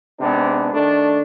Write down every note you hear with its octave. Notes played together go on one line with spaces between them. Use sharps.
G#2 C3 B3 D4
D#3 A3 D4